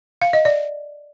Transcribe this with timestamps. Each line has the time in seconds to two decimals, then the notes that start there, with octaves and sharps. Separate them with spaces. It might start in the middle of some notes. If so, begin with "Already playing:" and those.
0.22 F5
0.33 D#5
0.45 D5